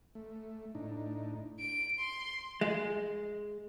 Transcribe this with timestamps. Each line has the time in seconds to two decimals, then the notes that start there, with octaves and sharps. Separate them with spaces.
0.15 A3
0.75 A2 D4 D#4
1.60 D7
1.99 C6
2.61 G#3